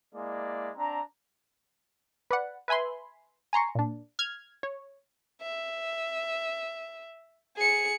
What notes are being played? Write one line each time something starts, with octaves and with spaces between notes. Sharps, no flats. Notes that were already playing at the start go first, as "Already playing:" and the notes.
G#3 A#3 E4 D5
C4 D4 A#5
B4 D5 F#5
B4 E5 G#5 B5 C6
G#5 A#5 C6 C#6
A#2 D4
F6 G#6
C#5
E5
G#4 C#7